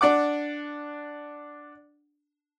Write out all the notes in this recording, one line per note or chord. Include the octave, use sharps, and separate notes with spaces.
D4 D5 F#5 D6